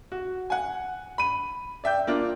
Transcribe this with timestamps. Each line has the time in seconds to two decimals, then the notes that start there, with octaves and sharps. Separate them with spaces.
0.12 F#4
0.50 F#5 G#5
1.18 B5 D#7
1.84 D5 E5 G5 G6
2.07 A#3 D4 F4